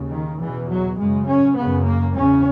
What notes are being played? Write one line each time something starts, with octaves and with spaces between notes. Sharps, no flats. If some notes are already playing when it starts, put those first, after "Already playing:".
Already playing: D#2 C#3
D#3
E2 B2 E3
F#3
F#2 C#3 G#3
C#4
F#2 C#3 B3
A#3
E2 C#3 C#4